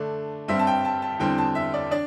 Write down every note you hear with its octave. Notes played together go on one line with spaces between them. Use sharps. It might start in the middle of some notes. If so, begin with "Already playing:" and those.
Already playing: D3 A3 D4
G2 G3 C4 E5
A5
G5
A5
A5
E2 D3 G3 C4 G5
A5
E5
D5
D4 D5